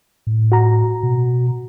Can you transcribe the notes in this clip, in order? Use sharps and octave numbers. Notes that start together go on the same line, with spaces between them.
A2
F#4 A#5
B2